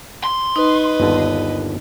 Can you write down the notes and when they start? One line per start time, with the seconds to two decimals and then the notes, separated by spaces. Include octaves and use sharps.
0.24 C6
0.56 D#4 B4 D#5
1.00 G1 D#2 D3